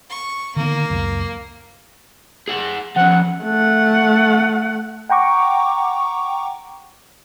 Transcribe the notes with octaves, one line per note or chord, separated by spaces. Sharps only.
C#6
D3 D#3 A#3 B3
C#2 F#2
G#4 F#5
F3 C#4 F#5
A3 F#5
F#5 G5 A#5 C#6 D6